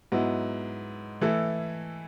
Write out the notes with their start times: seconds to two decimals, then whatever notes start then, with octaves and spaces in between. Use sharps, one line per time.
0.12 G#2 F#3 B3 E4
1.21 E3 A3 E4 A4